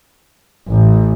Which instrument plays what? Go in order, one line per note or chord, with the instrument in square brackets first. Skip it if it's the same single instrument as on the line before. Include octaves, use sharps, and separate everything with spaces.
[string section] A1